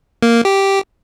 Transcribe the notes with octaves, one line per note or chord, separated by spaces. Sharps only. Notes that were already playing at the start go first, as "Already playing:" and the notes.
A#3
G4